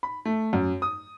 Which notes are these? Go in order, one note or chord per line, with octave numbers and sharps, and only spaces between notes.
B5
A3
F#2
D#6